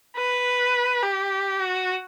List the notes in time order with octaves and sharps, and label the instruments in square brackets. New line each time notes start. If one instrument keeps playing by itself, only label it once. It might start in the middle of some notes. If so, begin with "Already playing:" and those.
[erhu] B4
G4
F#4